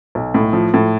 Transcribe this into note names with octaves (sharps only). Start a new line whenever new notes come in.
B1
A2
F3
A2